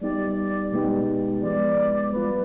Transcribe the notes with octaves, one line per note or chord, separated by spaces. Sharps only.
G3 B3 D#4 G4 D5
B2 G#3 B3 D#4 G4
F3 G#3 B3 D5
G3 B3 F4 B4